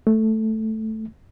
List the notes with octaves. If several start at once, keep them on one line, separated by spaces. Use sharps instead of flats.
A3